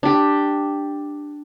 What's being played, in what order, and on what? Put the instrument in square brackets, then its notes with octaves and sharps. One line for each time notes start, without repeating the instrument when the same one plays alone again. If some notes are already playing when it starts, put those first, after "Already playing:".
[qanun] D4 G4